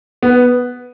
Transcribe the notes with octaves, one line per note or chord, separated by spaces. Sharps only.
B3